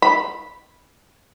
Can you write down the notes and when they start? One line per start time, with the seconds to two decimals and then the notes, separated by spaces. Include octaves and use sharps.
0.02 B5